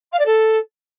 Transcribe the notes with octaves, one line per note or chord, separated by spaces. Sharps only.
F5
D5
A4